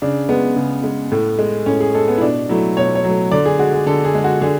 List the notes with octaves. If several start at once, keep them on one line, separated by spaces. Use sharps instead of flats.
C#3 D4
G#3 B3
C#3
G#3
A2
G#3
A2 C#4
G#4
G#3 A4
B3
E4
B2 D4
F#3 A3 E4
B2 C#5
C#5
F#3 A3
D3 D5
G#4
G#3 F#4
G#4
D3 A4
G#4
G#3
F#4
D3 G#4